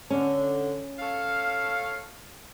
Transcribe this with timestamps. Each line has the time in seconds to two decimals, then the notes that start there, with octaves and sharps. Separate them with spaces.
0.10 D3 C#4
0.99 A4 C#5 F5